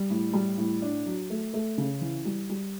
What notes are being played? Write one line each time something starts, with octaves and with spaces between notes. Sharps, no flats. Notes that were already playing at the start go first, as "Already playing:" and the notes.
Already playing: G3
A2
G3
A2
D4
F#3
A3
A3
C#3
E3
G3
G3